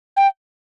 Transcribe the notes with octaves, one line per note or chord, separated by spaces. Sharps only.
G5